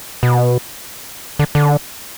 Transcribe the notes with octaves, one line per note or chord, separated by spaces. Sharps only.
B2
D3
D3